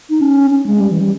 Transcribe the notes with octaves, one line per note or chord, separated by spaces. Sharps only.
D#4
C#4
C#4
G#3
G3
E3
G3